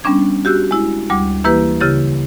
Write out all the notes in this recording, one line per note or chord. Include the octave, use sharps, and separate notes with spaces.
G3 B3 C#4 D4 G#6
F#4 G4 E6 F#6
G#3 E4
D2 G3 D6
E3 A#3 E4 G4 B4
C#3 E4 G4 A6